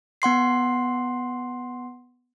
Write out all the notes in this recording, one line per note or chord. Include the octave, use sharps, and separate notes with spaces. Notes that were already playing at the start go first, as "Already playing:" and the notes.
B3 F#5 C6 C7